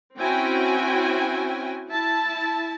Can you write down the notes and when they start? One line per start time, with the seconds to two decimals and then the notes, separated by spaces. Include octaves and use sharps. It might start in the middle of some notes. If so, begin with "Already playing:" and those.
0.18 C4 C#4 E4 F#4 G5 G#5
1.88 E4 A5